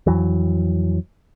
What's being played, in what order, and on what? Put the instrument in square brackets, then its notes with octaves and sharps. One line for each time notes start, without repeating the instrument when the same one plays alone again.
[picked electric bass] F2 E3 F#3